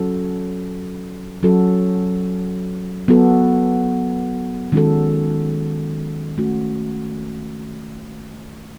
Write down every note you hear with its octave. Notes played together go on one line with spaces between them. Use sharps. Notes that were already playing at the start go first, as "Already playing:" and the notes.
Already playing: F#3 C#4 F#4 A4
F#3 C#4 F#4 A4
F#3 B3 F#4 A4
D#3 G#3 C#4 F#4 A4
A3 C#4 F#4